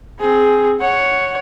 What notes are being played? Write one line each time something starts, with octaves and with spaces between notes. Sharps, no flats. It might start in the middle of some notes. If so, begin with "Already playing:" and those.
C4 G#4
C#5 F#5